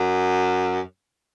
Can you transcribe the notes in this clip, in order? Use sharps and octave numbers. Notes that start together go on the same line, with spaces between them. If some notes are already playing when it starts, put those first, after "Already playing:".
Already playing: F#2